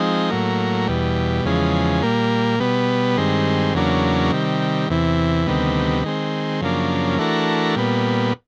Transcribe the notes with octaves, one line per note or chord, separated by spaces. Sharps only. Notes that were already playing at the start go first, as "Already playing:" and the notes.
Already playing: F3 G#3 C4 D#4
A2 F#3 A#3
E2 B2 G3
E2 C#3 F3 G#3
A#2 G3 A#3
B2 G3 B3
G2 D#3 G#3 C4
E2 C#3 F#3 A#3 D4
C3 D#3 G3
E2 C3 E3
D2 C3 D#3 G3 B3
D#3 G#3 C4
F#2 C#3 F3 A#3 D4
E3 A3 D4 F#4 A#4
A#2 G3 B3